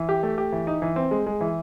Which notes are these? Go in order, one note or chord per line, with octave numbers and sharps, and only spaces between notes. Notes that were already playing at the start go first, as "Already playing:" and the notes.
Already playing: E3
G4
A3
G4
E3
D#4
E3
C4
G#3
G#3
E3